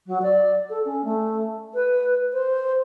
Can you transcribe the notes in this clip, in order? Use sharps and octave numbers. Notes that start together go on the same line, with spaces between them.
F#3
D5
A4
C#4
A3
B4
C5